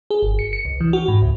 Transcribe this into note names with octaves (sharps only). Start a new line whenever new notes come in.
G#4
G1
C#7
C#7
C2
E3
F#4
G#2
C#2